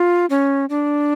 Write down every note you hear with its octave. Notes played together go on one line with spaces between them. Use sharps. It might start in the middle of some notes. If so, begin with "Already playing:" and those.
Already playing: F4
C#4
D4